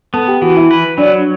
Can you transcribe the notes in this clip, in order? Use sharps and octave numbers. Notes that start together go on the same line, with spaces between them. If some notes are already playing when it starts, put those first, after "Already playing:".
B3 A4 A5
G4 G5
E3 F#4 F#5
E4 E5
B4
F#3 D4 D5